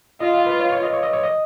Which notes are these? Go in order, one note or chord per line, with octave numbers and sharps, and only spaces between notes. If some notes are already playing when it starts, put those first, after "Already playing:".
F4 D#5
F5
B4
C#5
C#5
D#5
C#5
D#5
C#5
D#5